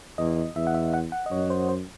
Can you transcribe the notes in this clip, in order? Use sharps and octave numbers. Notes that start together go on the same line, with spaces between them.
E2 D#5
E2 E5
F#5
E5
F#5
F#5
D#5
F#2 C#5
C5
C5